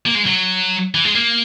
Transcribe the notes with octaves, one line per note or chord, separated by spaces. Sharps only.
A#3
G#3
F#3
E3
G#3
A#3